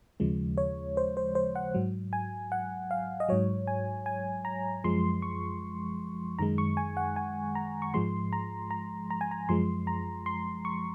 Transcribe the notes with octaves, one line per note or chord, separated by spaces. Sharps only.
D#2 C#3 F3 G#3
C#5
C5
C5
C5
F#5
G#2 F#3
G#5
F#5
F5
D#5
G#2 F#3 C#5
G#5
G#5
A#5
F#2 F3 G#3 C6
C#6
F#2 D#3 G#3 A#5
C#6
G#5
F#5
G#5
A#5
C#6
G#2 F3 G#3 C6
A#5
A#5
A#5
G#5
A#5
F#2 F3 G#3 C6
A#5
C6
C#6